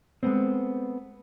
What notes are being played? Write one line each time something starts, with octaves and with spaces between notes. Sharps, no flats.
G#3 A3 B3 C4